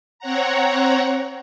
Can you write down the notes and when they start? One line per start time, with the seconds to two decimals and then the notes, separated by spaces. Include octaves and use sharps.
0.19 C4 C#5 F#5 A#5